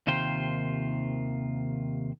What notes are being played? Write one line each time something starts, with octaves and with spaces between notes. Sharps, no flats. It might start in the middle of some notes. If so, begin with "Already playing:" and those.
D#2 C3 D#3 F4 C5 G5